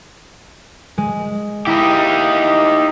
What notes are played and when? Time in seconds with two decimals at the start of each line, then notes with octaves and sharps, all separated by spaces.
0.98 G#3
1.67 D#4 E4 G4